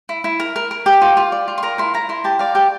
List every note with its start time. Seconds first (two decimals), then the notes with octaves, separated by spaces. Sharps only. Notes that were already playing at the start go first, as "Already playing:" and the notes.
0.09 E4
0.24 E4
0.40 A#4
0.56 A#4
0.71 A#4
0.86 G4
1.02 F4
1.17 F4
1.32 D5
1.48 F4
1.58 C6
1.63 A#4 A#5
1.78 E4 C6
1.94 E4 A#5
2.09 E4 C6
2.24 G4 A5
2.39 D5 F5
2.55 G4 A5